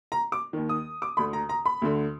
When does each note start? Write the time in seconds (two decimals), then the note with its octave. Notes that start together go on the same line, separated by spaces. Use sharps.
0.12 A#5
0.32 D6
0.53 D#2 D#3
0.69 D#6
1.02 D6
1.17 D2 D3 B5
1.33 A#5
1.49 A#5
1.66 B5
1.82 D2 D3